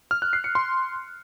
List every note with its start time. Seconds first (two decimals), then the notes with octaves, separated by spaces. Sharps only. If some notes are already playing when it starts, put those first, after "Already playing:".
0.11 F6
0.22 F#6
0.33 C7
0.44 C#7
0.55 C6